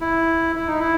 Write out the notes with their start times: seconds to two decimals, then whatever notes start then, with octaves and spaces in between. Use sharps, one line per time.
0.01 E4
0.56 E4
0.68 D#4
0.79 E4